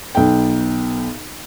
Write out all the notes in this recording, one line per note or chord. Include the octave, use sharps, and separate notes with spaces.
B1 G5